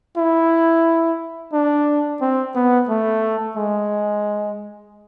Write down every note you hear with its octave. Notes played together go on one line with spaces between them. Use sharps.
E4
D4
C4
B3
A3
G#3